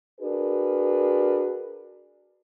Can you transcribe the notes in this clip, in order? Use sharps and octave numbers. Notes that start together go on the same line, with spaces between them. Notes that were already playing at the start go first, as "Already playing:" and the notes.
D4 F#4 G#4 A#4 B4